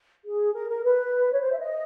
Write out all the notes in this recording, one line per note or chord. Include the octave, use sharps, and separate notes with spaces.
G#4
A#4
A#4
B4
C#5
C5
E5
D#5